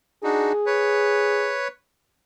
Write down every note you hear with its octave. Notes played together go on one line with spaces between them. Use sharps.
D4 D#4 F#4 G#4
B4 C#5